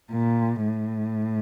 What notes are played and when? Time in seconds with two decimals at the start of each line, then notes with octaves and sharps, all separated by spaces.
0.12 A#2
0.65 A2